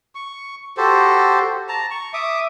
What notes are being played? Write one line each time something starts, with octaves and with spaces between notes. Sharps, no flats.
C#6
F#4 G4 A4 C5
A5 A#5
C#6
E5 D6 D#6